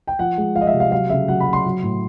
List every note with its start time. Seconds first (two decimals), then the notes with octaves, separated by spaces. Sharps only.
0.07 G5
0.19 F3 F#5
0.38 G#3
0.55 F3 F5
0.61 D#5
0.67 E5
0.74 C3
0.80 F5
0.92 F#3 F5
1.10 C#3 E5
1.28 F#3 F#5
1.40 B5
1.47 F#3
1.53 C6
1.65 F#3
1.83 A2